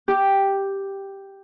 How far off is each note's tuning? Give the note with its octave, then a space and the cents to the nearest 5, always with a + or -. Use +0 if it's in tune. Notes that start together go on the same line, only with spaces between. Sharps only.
G4 +0